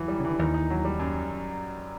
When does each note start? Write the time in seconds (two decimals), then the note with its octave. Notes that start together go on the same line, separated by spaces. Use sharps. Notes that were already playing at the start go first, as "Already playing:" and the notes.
Already playing: D#2 E3 F#3
0.08 G3
0.20 C#3
0.25 E3
0.30 D3
0.39 D#2 D#3 D#4
0.54 D#4
0.70 F#3
0.85 G3
0.99 F#2